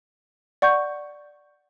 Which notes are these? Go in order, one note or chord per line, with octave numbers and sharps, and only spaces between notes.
D5 F#5 C#6 G6